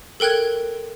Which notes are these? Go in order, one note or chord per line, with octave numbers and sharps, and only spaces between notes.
A4 A#4 G5 F#6 G#6